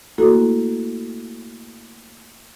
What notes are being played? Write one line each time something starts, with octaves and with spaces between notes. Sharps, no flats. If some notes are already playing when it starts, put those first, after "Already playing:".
A3 A#3 E4 F#4 A4